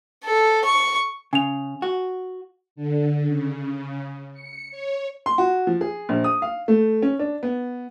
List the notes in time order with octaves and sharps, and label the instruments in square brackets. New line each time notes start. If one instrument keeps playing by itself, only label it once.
[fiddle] A4
C#6
[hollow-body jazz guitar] C#3 [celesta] G#5 F7
[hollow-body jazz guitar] F#4
[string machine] D3
C#3
C#7
C#5
[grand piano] C6
F#4
F3
G#4
A#1
D#6
F5
A3
C#4
D4
B3